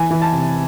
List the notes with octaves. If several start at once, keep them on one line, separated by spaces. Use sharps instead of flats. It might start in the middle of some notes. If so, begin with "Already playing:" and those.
Already playing: E3 G#5
E3
A5
C3